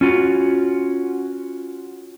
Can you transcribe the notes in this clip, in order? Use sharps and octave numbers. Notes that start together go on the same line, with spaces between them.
C#4 F4 F#4